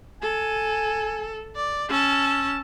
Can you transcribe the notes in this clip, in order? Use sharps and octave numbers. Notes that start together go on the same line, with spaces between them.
A4 G#5
D5
C#4 A5 E6